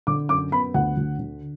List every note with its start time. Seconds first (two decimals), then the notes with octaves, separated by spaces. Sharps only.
0.07 D3 D6
0.29 F#2 D6
0.52 B3 B5
0.74 D2 F#5
0.97 D2
1.19 D3